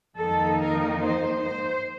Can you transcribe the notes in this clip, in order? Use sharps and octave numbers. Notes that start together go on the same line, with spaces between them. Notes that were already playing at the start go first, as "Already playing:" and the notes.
F2 D#3 A#3 D#4 A4
A#4
C5
C5